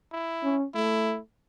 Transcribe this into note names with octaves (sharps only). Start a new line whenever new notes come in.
E4
C#4
A3 E4